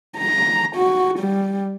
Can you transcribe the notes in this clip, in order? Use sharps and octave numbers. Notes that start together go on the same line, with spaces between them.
A#5
F#4
G3